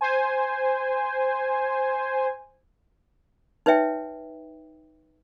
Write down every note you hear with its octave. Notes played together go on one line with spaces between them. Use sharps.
C5 G#5
D#4 B4 C#5 E5 G5